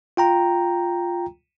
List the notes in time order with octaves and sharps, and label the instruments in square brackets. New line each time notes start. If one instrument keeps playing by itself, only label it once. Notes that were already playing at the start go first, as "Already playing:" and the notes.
[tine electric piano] F4 G5 A#5